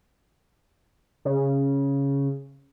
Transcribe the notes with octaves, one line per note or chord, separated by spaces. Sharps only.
C#3